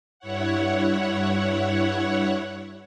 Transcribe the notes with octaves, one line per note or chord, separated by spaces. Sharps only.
G2 E4 C#5 F#5